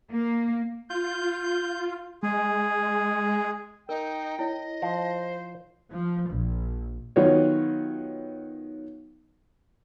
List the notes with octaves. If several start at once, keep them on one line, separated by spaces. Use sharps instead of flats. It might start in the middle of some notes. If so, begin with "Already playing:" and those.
A#3
F4 G6
G#3 G#4
D#4 A#4 G5
E4 C#5 D#5
F3 C5
F3
A#1
D#3 F#3 B3 F4 F#4 C#5